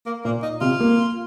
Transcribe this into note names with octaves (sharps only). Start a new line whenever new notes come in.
A#3
A#2 A#3
D#4
C3 F4
A#3